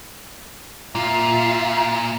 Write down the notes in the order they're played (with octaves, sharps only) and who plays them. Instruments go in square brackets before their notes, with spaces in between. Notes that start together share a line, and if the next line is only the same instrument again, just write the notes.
[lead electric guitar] A#2 [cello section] F4 E5 F5